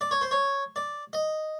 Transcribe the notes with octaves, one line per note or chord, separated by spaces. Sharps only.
D5
C#5
C5
C#5
D5
D#5